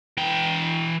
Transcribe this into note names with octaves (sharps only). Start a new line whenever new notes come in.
E3 G5